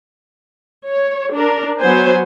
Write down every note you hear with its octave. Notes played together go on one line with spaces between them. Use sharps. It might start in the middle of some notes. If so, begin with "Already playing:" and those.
C#5
D4 A#4
F#3 B3 C5 G#5